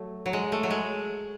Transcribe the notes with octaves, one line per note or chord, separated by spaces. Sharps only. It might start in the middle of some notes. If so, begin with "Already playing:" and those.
Already playing: F#3 A3
F#3
G#3
A3
F#3
G#3